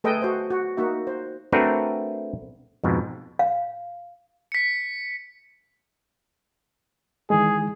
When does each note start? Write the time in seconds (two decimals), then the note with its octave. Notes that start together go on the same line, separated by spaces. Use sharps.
0.04 A3 G#4 A4 B4 D#5 G5
0.22 F#4 C5
0.50 F#4
0.77 A#3 D#4 F#4 E5
1.07 C5
1.52 A3 C4 D4 F#4 A#4 B4
2.84 F2 G#2 B2
3.39 F5
4.52 B6 C#7
7.30 D#3 E3 G#3 G#4